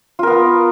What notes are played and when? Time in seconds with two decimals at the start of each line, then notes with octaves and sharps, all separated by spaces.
0.19 F4
0.23 A#4
0.27 B3